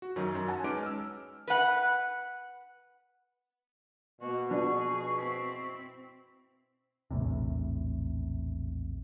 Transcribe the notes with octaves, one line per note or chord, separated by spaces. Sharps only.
F#4
F#2 D#3 F#3 C#4 D#4
F#2
F#5 G#5 A5
G#3 C#4 D#4 B4 D6 D7
E6 F6
B4 F#5
B2 A#3 F#4 C#6
F3 D4 G#4
C4 E4
A#1 E2 A2 C3